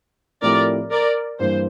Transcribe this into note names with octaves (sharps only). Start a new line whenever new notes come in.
A2 F3 A3 C4 G4 A#4 D5
A#4 D5
G2 E3 A#3 C5